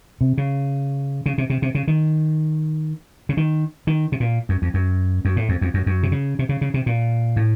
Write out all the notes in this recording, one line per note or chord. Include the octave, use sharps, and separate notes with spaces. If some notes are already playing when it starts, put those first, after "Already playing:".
C3
C#3
C#3
C3
C3
C3
C#3
D#3
C#3
D#3
D#3
C3
A#2
F#2
F2
F#2
F#2
A2
F2
F2
F#2
F#2
C3
C#3
C3
C#3
C#3
C3
A#2
A2